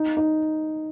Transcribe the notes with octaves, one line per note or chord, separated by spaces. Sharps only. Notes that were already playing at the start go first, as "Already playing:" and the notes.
Already playing: D#4
D#4